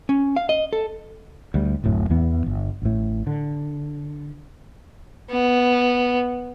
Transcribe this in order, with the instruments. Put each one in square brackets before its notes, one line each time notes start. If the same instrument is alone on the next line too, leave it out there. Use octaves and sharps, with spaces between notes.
[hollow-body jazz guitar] C#4
F5
D#5
A4
[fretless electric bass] D2 G3
D1 F#2 A2
E2 E3 B3
G1
A1 A2
D3
[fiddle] B3